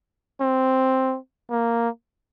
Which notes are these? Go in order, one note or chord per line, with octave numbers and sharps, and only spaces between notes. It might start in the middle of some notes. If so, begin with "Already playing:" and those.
C4
A#3